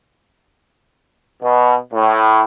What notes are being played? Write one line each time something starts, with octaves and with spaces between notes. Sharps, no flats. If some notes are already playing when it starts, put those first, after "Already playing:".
B2
A2